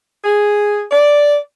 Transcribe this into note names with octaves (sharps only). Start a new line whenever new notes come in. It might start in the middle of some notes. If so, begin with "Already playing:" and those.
G#4
D5